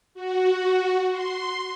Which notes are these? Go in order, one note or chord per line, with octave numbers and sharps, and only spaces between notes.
F#4
C6